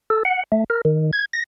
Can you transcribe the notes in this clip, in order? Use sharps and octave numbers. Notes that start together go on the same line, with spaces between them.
A4
F#5
A3
A#4
D#3
G#6
A#6